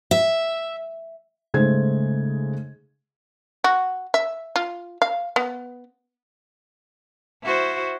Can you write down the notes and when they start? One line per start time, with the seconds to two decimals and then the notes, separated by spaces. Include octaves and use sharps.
0.11 E5
1.54 G#2 C#3 A3 G#4 C5 G#6
3.64 F#4
4.14 E5
4.56 F4
5.02 F5
5.36 B3
7.43 E4 F#4 C5